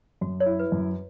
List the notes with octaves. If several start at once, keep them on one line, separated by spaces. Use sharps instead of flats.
F#2 F#4
C#5
E4
B4
F#2